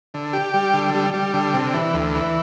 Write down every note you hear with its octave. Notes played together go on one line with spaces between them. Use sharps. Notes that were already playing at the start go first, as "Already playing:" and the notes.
D3
G4
G3
D3
G3
G3
D3
C3
E3
D2
E3